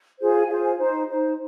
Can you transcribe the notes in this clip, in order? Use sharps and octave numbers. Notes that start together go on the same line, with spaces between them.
F4 G#4 C5
G#5
F4 G#4 C5 F5
G#5
D#4 C5
D#4 C5